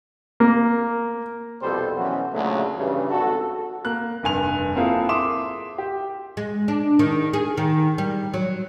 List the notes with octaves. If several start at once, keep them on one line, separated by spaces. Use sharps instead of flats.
A#3
C2 F2 B2 G3 A4 C5
B2 E3 F#3 B3 C#4 F#4
D2 A#2 C#3 F#3 A3
G2 C#3 E3
G#1 F#4 A4
A#3 F#6
F1 G2 G#5 F7
A#3 C4 E4 F4 G#4 A4
E5 C6 D6 D#6 E7
G4
G#3
D4
D#3
G#4
D#3
G3
F#3